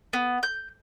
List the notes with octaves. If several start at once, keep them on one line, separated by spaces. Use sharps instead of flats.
B3
G6